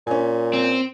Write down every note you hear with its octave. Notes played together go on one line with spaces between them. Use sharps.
A#2 C#4 G#5
C4